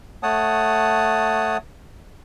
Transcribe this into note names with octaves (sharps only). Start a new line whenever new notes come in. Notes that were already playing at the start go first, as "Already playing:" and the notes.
A3 C#5 F#5 A5 D#6